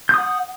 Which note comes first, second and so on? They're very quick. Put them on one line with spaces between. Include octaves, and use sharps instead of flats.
G6 D#6 F#5